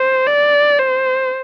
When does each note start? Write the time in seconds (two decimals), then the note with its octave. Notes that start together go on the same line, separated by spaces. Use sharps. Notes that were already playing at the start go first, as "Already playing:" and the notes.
Already playing: C5
0.27 D5
0.79 C5